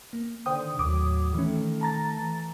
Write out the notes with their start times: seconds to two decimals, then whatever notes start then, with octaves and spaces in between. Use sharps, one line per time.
0.13 A#3
0.46 D3 D#3 C5 G5 D#6
0.79 D#2 A2 F#3 D6 D#6
1.34 D#3 E3 A3 C#4
1.81 A5 A#5 A6
2.18 E3